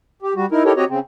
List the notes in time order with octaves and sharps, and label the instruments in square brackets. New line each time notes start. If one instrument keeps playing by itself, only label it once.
[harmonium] G4
G3 F#4
D#4 E4 A#4
D#4 E4 G4 A4 A#4 C#5
C4 F#4 G4 C#5 D#5 A#5
C#3 C4